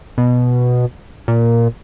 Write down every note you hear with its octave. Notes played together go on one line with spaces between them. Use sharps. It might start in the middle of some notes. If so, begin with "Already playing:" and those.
B2
A#2